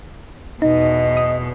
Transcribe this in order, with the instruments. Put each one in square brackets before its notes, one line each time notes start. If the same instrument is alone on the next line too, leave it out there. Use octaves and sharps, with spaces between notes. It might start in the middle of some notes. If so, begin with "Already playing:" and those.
[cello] E2 B2 [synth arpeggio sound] D#4 [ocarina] D#5
[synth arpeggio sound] D#6